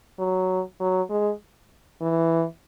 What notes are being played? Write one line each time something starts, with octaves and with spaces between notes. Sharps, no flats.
F#3
F#3
G#3
E3